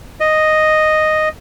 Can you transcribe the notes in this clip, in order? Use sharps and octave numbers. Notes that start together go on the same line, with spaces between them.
D#5